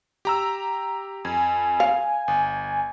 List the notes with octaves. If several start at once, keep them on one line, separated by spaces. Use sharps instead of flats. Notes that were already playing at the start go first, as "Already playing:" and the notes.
G4 A#5 E6
F2 G#5
F5
G1